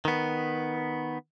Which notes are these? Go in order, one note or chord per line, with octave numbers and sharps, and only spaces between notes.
D#3 B3